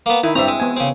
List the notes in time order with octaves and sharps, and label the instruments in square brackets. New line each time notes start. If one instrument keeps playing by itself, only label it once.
[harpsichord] A#3 B3
[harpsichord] D#3 [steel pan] E4
[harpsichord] G2 A#5 [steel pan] C4 E5
[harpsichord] G#3
[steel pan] B3 G#5
[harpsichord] C#3 C4